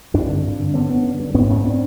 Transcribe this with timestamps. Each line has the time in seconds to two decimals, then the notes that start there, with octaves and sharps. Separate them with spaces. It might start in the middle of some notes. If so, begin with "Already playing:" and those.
0.14 G2 C4 D4
0.29 D3
0.45 G2
0.59 D3
0.74 D3 B3 C#4
0.89 D3 B3 C#4
1.05 G2
1.20 G2
1.34 G#2 B3 C#4
1.49 G#2 B3 C#4
1.65 C4 D4